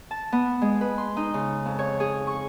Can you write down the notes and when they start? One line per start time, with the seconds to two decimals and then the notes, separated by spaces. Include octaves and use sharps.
0.11 A5
0.32 B3
0.62 G#3
0.81 B4
0.98 C6
1.17 D#4
1.34 C#3
1.65 F2
1.79 C#5
2.00 G#4
2.27 C#6